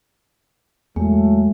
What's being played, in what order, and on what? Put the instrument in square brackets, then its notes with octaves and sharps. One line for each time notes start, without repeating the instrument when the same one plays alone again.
[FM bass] E2 [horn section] A2 F#3 A3 [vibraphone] G#3